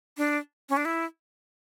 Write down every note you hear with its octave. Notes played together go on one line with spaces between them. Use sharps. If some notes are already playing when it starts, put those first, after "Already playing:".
D4
C#4
D4
E4